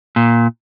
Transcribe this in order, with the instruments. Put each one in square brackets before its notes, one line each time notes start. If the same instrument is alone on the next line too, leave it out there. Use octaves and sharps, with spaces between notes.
[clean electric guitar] A#2